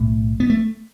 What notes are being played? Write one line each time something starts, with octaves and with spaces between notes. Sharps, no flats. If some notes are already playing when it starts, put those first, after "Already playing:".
Already playing: B1 A2
B3
A3